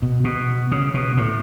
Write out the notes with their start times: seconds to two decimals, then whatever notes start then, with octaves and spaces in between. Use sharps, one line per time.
0.02 B2
0.24 B2
0.72 C#3
0.94 B2
1.17 A2